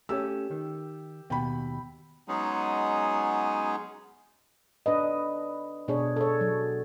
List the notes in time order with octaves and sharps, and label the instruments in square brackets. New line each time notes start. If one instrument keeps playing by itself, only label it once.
[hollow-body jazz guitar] A3 C#4 [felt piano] G4 E6
[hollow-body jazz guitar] D#3
[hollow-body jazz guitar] D#2 B2 [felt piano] G5 B5
[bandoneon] F#3 G#3 B3 C#4 D#4 G#4
[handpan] D4 B4 D#5
B2 D4 G#4 C#5
A4 C#5
F#3